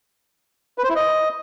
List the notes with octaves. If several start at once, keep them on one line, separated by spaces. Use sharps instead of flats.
B4
C5
E4
D#5